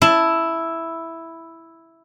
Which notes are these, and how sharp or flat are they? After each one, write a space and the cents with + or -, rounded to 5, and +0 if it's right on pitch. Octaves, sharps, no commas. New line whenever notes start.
E4 +0 A5 +0